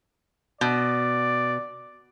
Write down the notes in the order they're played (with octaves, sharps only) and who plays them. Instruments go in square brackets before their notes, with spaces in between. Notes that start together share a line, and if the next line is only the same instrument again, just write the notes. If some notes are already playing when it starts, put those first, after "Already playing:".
[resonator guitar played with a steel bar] B2 [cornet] D5